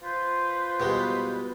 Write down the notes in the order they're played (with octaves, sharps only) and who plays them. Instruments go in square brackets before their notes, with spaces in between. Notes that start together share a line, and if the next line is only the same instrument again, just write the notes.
[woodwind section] F4 B4 [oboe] C5
[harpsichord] B2 G3 G#3